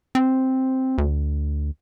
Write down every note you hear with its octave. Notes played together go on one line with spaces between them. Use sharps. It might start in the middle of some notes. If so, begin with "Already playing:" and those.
C4
D2